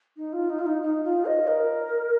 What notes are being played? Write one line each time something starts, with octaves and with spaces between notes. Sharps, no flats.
D#4
F4
D#4
F4
D#4
D#4
F4
D#5
A#4